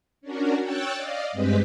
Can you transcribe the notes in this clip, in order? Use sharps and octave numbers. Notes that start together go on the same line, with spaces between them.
C#4 D4 F#4 A#4
C#5 G5 E6 F#6 A6
D5 D#5 F5
G2 G#3 C4 G4 B4 B5